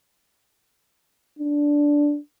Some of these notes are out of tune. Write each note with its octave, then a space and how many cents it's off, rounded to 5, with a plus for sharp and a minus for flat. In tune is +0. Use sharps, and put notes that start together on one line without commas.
D4 -10